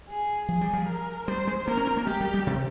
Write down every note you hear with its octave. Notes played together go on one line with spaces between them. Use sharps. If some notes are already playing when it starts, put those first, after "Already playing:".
G#4
F3 G#4
G3
F3
A#4
G3 C5
G#3
A#3 A#4
C#4
C4
A#3
G#3 G4
G3
G3
C3